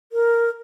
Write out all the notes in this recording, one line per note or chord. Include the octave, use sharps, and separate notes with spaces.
A#4